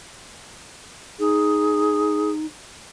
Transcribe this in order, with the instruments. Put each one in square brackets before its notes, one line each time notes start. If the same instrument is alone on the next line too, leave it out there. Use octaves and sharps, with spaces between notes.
[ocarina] D#4 [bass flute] G#4